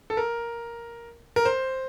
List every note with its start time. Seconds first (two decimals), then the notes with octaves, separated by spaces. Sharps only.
0.10 A4
0.17 A#4
1.36 A#4
1.45 C5